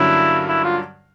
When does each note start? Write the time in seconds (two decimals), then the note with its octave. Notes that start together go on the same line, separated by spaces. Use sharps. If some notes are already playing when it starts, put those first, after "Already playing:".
Already playing: G2 D3 F#3 A#3 C#4 E4
0.49 E4
0.64 F4